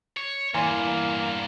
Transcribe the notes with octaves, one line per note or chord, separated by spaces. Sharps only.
C#5
E2 G2 E3 A#3 G#5 C6